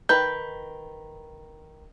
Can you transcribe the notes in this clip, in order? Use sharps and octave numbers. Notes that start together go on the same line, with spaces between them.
D#3 B4 G6